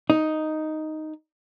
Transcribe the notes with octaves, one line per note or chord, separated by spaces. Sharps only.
D#4